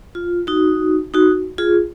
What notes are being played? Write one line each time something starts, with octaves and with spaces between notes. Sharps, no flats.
F4
D#4 F#4
D#4 F#4
F4 G#4